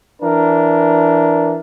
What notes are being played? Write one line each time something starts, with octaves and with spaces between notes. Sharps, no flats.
E3 D4 A#4